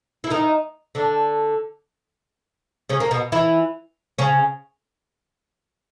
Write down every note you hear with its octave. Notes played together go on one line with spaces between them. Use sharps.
E4
D#3 D#4
D3 D4
C#3 C#4
A#3
B2 B3
E3 E4
C#3 C#4